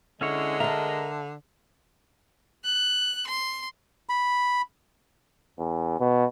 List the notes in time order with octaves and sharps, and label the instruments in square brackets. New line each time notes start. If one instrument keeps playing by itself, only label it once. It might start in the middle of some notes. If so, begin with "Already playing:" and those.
[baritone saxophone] D3 [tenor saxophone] G#3 [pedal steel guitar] C#4 E4 C#5
[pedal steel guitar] A#4 A#5 [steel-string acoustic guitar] E5 A5
[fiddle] F#6
C6
[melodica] B5
[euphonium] E2
B2